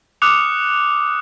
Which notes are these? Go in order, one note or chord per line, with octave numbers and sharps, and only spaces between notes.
D6 D#6 F6 F#6 C#7 F7